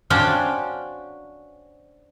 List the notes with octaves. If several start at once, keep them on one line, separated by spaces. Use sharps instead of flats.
C#4 D4 F#4 C5 F5 G5